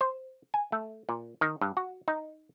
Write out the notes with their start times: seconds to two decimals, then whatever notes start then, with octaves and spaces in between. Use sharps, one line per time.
0.01 C5
0.54 G#5
0.72 A3
1.09 A#2
1.41 D#3
1.61 G2
1.77 F#4
2.08 D#4